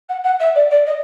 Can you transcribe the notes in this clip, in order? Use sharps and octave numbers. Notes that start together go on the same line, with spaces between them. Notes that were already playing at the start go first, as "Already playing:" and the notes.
F#5
F#5
E5
D5
D5
D#5